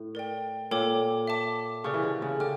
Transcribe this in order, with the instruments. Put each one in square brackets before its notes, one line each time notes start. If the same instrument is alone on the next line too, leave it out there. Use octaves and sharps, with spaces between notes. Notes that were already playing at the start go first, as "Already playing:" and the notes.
Already playing: [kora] A2
[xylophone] A#4 D5 G5
[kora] A#2 [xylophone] A4 C#5 G5 D6
[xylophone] E5 A5 D6
[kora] C#3 [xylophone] G4 A#4 D5 F5 C#6
[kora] E3
D3
C#3
[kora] D3 [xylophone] G5 D6 F6